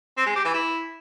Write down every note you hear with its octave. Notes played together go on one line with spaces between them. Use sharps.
C4
G#3
G4
E3
E4